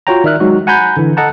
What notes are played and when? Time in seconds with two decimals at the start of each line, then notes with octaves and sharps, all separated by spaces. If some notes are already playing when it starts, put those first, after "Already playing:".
0.07 F4 F#4 C#5 G5 A#5
0.24 D#3 D5 E5 F6 F#6
0.40 F#3 G#3 D#4 F#4
0.67 F#5 G#5 A#5 B5 G6
0.97 D3 E3
1.17 A4 D#5 F#5 A5 A#5